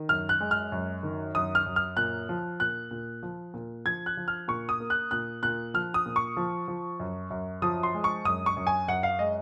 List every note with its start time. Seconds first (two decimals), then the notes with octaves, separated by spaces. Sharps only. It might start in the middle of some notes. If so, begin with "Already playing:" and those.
Already playing: D#3
0.09 F#2 F6
0.29 F#6
0.40 G#3
0.51 F6
0.72 F#2
1.03 D#3
1.35 F#2 D#6
1.55 F6
1.66 F#2
1.76 F6
1.97 A#2 F#6
2.29 F3
2.60 A#2 F#6
2.91 A#2
3.23 F3
3.54 A#2
3.85 F3 G#6
4.06 F#6
4.17 F3
4.28 F6
4.48 A#2 C#6
4.69 D#6
4.80 A#3
4.90 F#6
5.11 A#2 F#6
5.43 A#2 F#6
5.74 F3 F6
5.94 D#6
6.06 A#2
6.16 C#6
6.37 F3
6.68 F3
7.00 F#2
7.30 F#2
7.62 F3 D#6
7.83 C6
7.94 G#3
8.04 C#6
8.25 F#2 D#6
8.46 C#6
8.56 F#2
8.67 G#5
8.88 F#2 F#5
9.03 F5
9.19 G#3 D#5